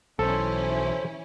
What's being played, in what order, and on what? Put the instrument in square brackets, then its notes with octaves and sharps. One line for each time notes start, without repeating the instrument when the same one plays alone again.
[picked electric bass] B1 [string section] E3 C#4 E4 [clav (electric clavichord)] A4 [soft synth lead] C5